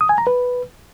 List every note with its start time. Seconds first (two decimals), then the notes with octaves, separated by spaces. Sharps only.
0.01 D#6
0.09 G#5
0.18 A#5
0.27 B4